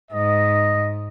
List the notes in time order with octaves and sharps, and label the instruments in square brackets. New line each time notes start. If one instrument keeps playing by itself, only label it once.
[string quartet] G#2 [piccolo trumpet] D#5